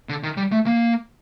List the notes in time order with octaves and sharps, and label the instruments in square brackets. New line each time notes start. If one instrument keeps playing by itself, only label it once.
[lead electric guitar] D3
D#3
G3
A3
A#3